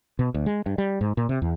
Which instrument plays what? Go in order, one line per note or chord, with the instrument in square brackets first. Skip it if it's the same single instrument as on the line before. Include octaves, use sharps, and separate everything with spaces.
[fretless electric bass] B2
D2
G#3
G2
G3
G#2
A#2
C3
E2